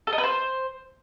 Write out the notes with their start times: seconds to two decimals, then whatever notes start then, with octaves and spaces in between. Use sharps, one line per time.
0.07 A4
0.13 D#5
0.18 B4
0.24 C5